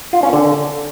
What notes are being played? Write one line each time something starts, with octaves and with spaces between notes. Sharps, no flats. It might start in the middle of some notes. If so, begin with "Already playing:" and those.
F4
C#4
D3